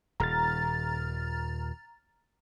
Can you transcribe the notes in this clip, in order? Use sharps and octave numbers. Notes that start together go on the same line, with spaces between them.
D#1 A#5 F6 A6